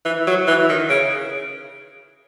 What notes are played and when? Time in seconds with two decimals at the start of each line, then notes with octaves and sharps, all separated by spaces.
0.05 E3
0.27 F#3
0.47 E3
0.69 D#3
0.90 C#3